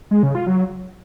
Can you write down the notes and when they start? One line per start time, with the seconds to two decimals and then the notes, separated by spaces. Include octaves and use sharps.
0.11 G#3
0.23 C#3
0.35 F4
0.47 F#3